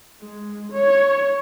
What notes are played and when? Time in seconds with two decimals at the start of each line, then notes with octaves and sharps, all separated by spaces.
0.22 G#3
0.72 C#5